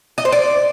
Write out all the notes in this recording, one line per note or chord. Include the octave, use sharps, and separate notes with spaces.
D#5
C5
D5